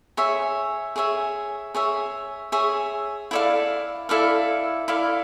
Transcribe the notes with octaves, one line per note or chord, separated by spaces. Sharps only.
G#4 C#5 E5
G#4 C#5 E5
G#4 C#5 E5
G#4 C#5 E5
E4 A4 D5 F5
E4 A4 D5 F5
E4 A4 D5 F5